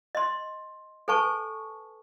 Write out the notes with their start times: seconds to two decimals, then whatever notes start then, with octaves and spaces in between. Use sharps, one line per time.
0.15 D#5 C6
1.08 A4 B4 G#5 A5 C#6